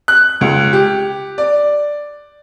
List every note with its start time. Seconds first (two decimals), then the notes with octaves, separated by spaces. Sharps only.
0.08 F#6
0.41 C#2
0.73 G4
1.38 D5